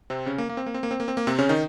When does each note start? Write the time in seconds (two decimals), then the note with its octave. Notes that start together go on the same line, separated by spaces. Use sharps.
0.10 C3 C4
0.26 C#3 C#4
0.38 A#3
0.49 A#3
0.57 C4
0.66 A#3
0.74 C4
0.83 A#3
0.91 C4
1.00 A#3
1.08 C4
1.17 A#3
1.27 C3 C4
1.39 C#3 C#4
1.49 D#3 D#4